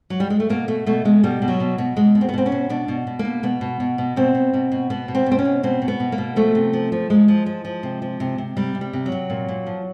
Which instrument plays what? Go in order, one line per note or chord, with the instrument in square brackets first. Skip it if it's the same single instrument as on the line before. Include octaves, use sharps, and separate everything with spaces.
[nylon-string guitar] F#3
G3
G#3
A3
B2 A#3
B2 A3
B2 A3
B2 G#3
B2 G3
B2
F#3
B2
B2
B2 G#3
B2
C4
B3
B2 C4
C#4
B2
B2 D4
B2
B2
A#3
B2
B2 B3
B2
B2
B2
B2 C4
B2
B2
B2
B2 B3
B2
C4
B2
C4
C#4
B2
B2 C4
B2
B3
B2
A#3
B2
F3 A3
C3
F3
F3
F3 G#3
F3
F3
F3
C3
F3
C3
C3
C3 G3
C3
G3
C3
F#3
C3
A#2
A#2
F3